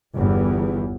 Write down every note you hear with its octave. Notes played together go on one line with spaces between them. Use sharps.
G1 E2